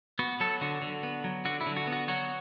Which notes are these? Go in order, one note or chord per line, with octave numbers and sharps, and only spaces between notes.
B3 F#4
F#3 A4
D3 F#4
D3
B3
F#3
D3 F#4
E4
D3
F#4
B3
F#4
F#3 F#4